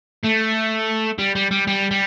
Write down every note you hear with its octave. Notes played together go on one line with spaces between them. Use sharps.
A3
G3
G3
G3
G3
G3